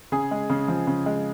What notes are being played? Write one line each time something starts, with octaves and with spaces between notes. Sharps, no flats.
C#3 G#4
G#3
C#3
F3
C#3
G#3